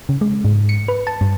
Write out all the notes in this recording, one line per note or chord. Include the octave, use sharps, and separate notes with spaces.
C#3
G#3
G#2
C#7
B4
A5
G2